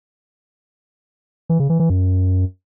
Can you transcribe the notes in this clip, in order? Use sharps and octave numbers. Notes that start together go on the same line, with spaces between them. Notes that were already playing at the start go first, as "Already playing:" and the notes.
E3
C#3
E3
E3
F#2